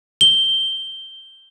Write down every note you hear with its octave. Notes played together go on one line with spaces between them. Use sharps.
G7